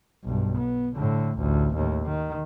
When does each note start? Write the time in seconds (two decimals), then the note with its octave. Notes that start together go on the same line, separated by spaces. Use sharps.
0.24 B1 G2
0.57 B3
0.96 A2 D3
1.38 A1 D2
1.75 D#2 A2
2.05 D#3